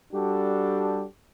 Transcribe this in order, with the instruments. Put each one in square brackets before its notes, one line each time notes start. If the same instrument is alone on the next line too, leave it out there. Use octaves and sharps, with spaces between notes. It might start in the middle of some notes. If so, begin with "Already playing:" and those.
[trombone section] G3 D4 F#4 G4 A4